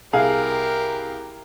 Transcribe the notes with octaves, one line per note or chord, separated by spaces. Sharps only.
C2 G4 G#4 A#4 F5